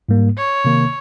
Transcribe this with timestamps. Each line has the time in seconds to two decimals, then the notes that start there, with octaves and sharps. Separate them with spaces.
0.09 G#2 G3 A#3
0.37 C#5
0.65 C3 D#3 A#3